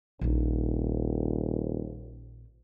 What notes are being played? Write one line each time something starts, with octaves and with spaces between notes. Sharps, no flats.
D#1 A#1 D#4